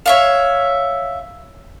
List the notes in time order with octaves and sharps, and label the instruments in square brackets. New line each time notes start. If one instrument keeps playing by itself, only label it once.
[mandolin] C#5 E5 F5